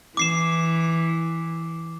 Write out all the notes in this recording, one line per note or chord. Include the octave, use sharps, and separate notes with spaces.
E3 D6 C7 E7